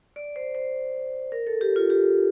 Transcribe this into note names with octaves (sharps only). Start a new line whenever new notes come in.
D5
C5
C5
A#4
A4
G4
F4
G4